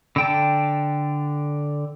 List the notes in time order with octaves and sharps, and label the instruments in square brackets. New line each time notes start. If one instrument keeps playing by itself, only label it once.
[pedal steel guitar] D3 G5 A5